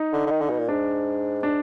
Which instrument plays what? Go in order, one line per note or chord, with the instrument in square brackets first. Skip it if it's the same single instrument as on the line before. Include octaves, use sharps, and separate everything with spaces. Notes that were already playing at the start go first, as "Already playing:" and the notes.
Already playing: [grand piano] D#4
[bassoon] D3
D3
D#3
D3
B2
A#2
[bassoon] G#2 [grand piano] D4
[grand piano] D4